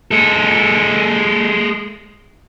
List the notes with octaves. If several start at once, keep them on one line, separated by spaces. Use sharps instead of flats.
G#3 A4